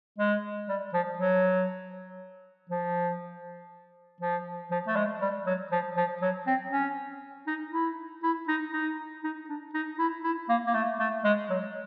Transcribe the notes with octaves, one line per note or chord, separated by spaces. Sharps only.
G#3
G3
F3
F#3
F3
F3
F3
A3
G#3
G3
F#3
F3
F3
F#3
C4
C#4
D#4
E4
E4
D#4
D#4
D#4
D4
D#4
E4
E4
A#3
A#3
A3
A3
G#3
F#3